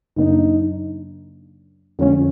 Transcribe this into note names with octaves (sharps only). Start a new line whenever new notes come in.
F#2 C#3 F#3 A#3 D4 D#4
F2 D3 F3 G#3 C#4